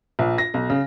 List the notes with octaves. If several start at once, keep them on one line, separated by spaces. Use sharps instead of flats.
A#1
A#6
B1
C#3